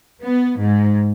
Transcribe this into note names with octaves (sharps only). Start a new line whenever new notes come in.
B3
G#2